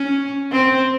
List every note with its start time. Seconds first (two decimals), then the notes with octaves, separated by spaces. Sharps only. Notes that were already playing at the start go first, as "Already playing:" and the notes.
Already playing: C#4
0.52 C4